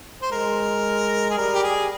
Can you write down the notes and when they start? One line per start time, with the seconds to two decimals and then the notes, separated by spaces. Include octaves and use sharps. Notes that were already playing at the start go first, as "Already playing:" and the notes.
0.22 C5
0.31 G#3 A#4
1.30 G#4
1.37 G3 A#4
1.55 G4
1.63 G#4